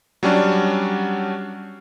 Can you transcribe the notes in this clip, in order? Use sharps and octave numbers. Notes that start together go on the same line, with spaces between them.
F#3 G3 C#4 D4 F#4